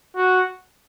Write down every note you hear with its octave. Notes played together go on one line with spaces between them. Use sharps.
F#4